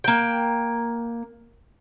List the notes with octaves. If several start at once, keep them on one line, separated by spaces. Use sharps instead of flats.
A#3 G5